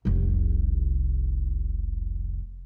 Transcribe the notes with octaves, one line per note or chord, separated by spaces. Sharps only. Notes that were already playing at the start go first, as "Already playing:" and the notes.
F1 C2